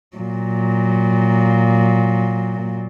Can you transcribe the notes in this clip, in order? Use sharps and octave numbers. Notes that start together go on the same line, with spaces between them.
A#2 F#3